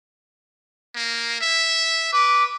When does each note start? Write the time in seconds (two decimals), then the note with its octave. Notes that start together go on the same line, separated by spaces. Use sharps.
0.95 A#3
1.41 E5
2.13 B4 D6